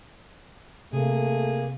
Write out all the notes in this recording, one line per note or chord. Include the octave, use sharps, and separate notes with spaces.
C3 A3 A#3 G#4